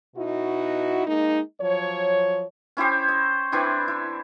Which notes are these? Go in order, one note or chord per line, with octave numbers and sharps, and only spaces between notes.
B2 D#4 E4 F#4
G#3 A#3 D#4
F3 F#3 C#5
C#4 E4 G4 C5
D#5
E3 C4 D4 E4
E4